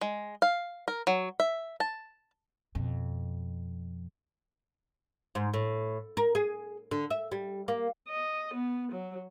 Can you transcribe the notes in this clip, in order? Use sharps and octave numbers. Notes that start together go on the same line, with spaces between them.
G#3
F5
A#4
F#3
E5
A5
F2 B2
G#2
A2
A#4
G#4
D3
E5
G3
A#3
D#5
B3
F#3